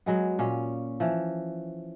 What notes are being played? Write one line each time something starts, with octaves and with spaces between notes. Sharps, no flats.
F#3 G#3 B3
A#2 C#4 F4
E3 F3